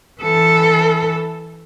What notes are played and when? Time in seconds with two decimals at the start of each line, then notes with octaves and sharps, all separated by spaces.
0.21 E3 A4